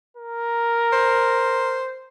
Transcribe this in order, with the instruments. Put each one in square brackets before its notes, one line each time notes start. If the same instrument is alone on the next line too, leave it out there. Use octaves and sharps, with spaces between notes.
[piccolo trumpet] A#4
[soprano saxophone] C5